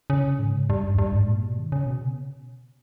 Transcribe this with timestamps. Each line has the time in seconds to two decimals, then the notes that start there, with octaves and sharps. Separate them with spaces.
0.10 C#3
0.39 G#2
0.70 G2
0.94 E2
0.98 G2
1.13 G#2
1.28 A#2
1.43 B2
1.58 D#3
1.72 C#3
1.86 B2